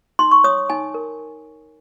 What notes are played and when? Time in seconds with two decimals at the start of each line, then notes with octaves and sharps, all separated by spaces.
0.19 D#4 C6
0.31 C#6
0.44 C#5 D#6
0.70 D#4 G#5
0.94 A#4